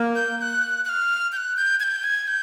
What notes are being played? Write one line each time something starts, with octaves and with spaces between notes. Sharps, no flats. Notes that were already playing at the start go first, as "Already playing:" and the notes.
Already playing: A#3
G6
G6
F#6
F#6
F6
G6
F#6
G6
G#6
G6
G#6
G6